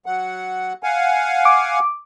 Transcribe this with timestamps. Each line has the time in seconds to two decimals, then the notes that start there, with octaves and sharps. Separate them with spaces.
0.06 F#3 F#5
0.83 F5 F#5 G#5
1.45 D6